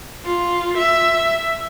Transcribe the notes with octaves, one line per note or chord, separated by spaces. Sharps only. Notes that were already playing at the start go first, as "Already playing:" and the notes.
F4
E5